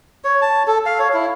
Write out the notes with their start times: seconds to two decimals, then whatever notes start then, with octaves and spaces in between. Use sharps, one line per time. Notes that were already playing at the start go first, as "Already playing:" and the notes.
0.24 C#5
0.42 A5
0.67 A4
0.86 F5
0.99 C#5
1.13 E4